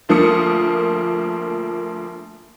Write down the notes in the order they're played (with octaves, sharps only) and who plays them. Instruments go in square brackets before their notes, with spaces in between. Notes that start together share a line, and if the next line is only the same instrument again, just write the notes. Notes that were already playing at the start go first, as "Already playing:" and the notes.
[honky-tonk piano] D2 F3 A#3 D#6 C#7